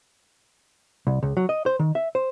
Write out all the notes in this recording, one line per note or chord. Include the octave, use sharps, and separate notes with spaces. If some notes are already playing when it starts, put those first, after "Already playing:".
C2
C#2
F#3
D#5
C5
D#3
E5
C5